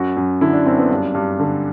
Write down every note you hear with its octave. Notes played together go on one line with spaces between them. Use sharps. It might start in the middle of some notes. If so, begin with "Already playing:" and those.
Already playing: F#2 F#4
F#2
D3 E4
D4
F#2 C4
B3
G2 D4
G2
D3